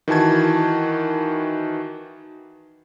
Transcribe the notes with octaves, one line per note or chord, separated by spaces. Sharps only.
D#3 E3 F#4 A5 G#6